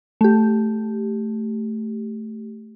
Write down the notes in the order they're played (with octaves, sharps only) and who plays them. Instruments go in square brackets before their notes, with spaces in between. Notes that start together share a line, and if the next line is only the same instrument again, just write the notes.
[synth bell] A3 G4